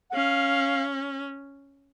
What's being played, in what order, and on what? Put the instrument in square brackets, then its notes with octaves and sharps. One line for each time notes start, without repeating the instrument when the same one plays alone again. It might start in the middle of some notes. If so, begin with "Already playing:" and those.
[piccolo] F#5
[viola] C#4 [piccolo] F5